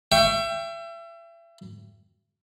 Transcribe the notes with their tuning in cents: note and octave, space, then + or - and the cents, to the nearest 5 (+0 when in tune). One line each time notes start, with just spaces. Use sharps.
E5 +35 G5 +0 C#6 +0